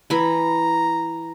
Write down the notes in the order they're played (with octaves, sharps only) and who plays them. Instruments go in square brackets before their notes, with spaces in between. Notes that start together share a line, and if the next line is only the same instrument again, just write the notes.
[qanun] E3 B5 [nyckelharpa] A#5